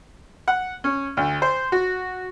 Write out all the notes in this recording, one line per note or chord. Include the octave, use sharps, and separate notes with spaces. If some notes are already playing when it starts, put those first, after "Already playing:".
F#5
C#4
D2
C5
F#4